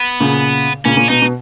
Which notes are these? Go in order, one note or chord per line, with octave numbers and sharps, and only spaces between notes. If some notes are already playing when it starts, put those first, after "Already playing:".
Already playing: B3
A#2 C#3
A#2 C#3 C#4
A#2
B2 D#4
B2